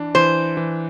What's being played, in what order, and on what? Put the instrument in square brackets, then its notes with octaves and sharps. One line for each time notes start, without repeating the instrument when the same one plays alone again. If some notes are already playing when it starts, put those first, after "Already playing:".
Already playing: [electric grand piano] E3 D4
[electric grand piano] E3 [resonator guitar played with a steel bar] C5
[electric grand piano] E3